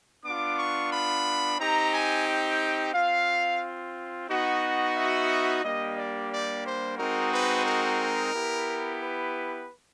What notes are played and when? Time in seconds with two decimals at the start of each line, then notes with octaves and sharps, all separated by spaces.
0.25 B3 D4 F4 D6
0.58 C#6
0.92 B5
1.59 C4 D#4 G4 A#5
1.93 G#5
2.27 G5
2.94 C4 F4 F5
4.29 B3 D#4 F#4
4.96 E5
5.63 G3 A#3 D4 G4 D#5
5.97 D5
6.31 D5
6.64 C5
6.98 G#3 C4 D#4 F#4 A#4
7.32 B4
7.66 A#4
8.33 B3 E4 G4
9.00 B4